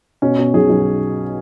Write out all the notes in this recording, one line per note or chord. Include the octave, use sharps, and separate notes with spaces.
B2 C#4
B2
B1 G#4
B1